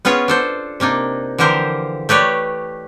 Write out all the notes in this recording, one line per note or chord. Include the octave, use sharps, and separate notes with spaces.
B3 C#4 F4 G#4 C#5
D4 A4 C5
C3 A#3 D4 D#4
D3 E3 F3 G4 A#4 C5
A3 G4 B4 C#5 D5